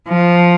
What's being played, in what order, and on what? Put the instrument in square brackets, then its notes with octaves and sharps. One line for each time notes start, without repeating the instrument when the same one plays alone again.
[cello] F3